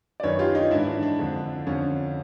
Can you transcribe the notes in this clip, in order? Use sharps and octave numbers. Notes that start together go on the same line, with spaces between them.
D5
F#2 D#3 B4 C#5
F4 G4
D#4 F4
G#2 E3 D4 E4
D4
D4
F2 D3
F2 D3 C#4